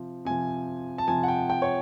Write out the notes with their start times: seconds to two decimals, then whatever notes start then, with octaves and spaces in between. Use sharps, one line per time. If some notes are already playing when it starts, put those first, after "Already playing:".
Already playing: C3 F3
0.25 C3 F3 G#5
0.98 A5
1.08 C3 F3 G#5
1.23 F#5
1.28 G5
1.50 G5
1.62 C#5